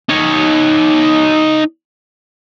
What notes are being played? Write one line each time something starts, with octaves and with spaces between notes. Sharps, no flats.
D#4 C#5